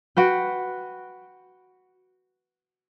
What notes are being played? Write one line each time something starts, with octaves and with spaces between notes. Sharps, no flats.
F#4 B4 G5